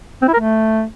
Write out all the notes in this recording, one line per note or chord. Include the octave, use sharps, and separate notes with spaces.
C4
E4
A#4
A3